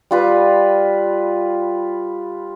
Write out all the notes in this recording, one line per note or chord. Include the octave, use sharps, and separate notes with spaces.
G3 F4 B4